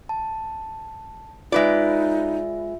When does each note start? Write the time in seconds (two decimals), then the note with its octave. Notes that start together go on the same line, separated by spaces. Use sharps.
0.09 A5
1.52 G#3 D#4 F4 B4 D5 E5